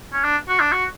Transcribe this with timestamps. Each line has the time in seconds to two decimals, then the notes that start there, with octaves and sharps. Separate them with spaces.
0.13 C#4
0.24 D4
0.49 F#4
0.60 D4
0.72 F#4